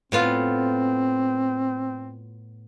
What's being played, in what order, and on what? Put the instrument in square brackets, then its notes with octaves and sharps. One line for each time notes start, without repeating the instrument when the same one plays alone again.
[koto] A2 B3 F4 [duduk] C4